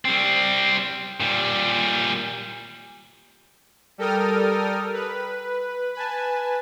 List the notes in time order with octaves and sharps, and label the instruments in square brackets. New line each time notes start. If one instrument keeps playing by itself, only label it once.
[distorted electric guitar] G3 C4
A#2 G3
[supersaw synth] G3 A4 A#4 G5 D#6 F6
B4
B4 G#5 A5